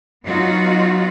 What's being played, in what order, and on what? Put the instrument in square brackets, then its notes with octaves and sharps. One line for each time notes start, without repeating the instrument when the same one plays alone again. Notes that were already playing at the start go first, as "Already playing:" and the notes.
[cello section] F#3 B3 D#4 F4 F#4